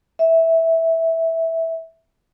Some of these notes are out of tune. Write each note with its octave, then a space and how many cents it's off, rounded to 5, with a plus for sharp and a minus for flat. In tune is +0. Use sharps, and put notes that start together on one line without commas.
E5 -10